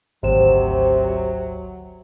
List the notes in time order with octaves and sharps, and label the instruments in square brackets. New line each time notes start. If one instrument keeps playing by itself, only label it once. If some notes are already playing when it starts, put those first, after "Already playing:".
[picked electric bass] G#1 D2 [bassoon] C3 [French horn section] F#3 [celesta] C5 E7